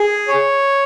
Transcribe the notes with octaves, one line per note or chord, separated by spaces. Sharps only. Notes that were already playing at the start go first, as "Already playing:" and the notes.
Already playing: G#4
C#5